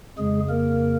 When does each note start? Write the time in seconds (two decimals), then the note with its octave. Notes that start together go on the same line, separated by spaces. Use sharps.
0.18 F2 C#3 G#3 G#4
0.49 A#3 A#4